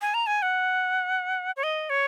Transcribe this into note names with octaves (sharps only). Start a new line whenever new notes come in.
G#5
A#5
G#5
F#5
C#5
D#5
C#5